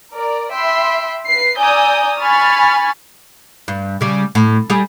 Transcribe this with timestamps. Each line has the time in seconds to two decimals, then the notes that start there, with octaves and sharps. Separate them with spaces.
0.12 A#4 D5
0.51 E5 G5 B5 C6
1.24 B4 C7
1.56 D5 G#5 A#5 D#6 E6 G6
2.19 G#5 B5 C#6 F6 G#6 A6
3.68 G2
4.01 C#3 G3
4.35 A2
4.70 G3 G4 G#4